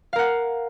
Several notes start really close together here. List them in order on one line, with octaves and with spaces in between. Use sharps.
F5 A#4 F#5